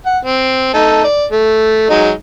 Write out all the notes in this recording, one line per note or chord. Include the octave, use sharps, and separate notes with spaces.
F#5
C4
A3 D#4 A4
D5
A3
F#3 G#3 D#4